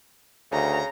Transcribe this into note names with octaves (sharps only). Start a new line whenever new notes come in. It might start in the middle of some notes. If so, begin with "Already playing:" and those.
D2 C#3 A#5